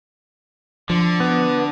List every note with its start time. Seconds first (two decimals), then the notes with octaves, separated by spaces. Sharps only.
0.90 D3 F3
1.20 B3